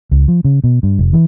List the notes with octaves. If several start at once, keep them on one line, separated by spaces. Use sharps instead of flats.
C#2
F3
C#3
B2
G2
F1
E3